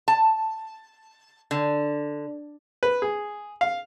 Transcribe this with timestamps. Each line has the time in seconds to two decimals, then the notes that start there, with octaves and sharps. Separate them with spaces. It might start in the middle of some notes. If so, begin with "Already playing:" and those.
0.08 A5
1.51 D3
2.83 B4
3.02 G#4
3.61 F5